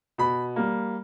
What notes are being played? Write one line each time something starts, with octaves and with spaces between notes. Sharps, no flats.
B2 B5
G3 A#3